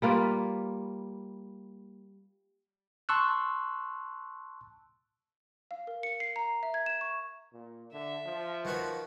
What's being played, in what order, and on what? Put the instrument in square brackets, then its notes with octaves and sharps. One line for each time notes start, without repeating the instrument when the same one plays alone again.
[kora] G3 A#3 F4 B4
[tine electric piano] A5 C6 C#6 E6 F#6
[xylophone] F5
A#4
C#7
C7
A#5
E5
G#6
E7
C#6
[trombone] A#2
[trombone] D3 [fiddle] E5
[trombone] F3
[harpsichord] D#3 B4 G#5 [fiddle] F#4